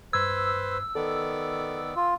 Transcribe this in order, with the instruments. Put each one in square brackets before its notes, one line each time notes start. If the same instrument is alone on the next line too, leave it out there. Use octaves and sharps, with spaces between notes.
[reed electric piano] G2 G#6 [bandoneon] B4 C5 [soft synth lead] E6
[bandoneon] D#3 B3 D5 [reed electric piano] A4
[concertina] F4